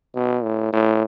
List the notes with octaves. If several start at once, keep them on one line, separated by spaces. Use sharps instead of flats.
B2
A2
A2